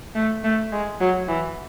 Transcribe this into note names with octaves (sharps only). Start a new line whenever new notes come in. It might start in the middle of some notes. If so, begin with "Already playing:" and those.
A3
A3
G#3
F#3
E3